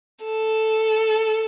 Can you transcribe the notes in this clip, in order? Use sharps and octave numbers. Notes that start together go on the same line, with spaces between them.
A4